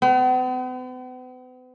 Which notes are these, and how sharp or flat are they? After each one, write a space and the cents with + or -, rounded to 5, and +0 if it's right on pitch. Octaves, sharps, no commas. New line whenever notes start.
B3 +45